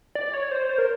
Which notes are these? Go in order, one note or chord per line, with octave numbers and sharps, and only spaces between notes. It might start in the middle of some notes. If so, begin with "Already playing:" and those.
D5
C#5
C5
C5
A#4